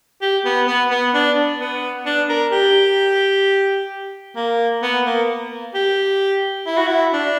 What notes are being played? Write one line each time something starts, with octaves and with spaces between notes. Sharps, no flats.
G4
B3
B3
B3
D4
B3
D4
A#4
G4
A#3
B3
A#3
G4
E4
F#4
E4
D4